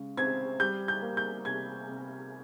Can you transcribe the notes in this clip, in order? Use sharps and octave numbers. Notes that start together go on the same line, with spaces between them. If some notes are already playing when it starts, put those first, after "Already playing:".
Already playing: C#3 G#3
C4 G#6
G3 G6
G6
A#3
G6
C3 G#6
C3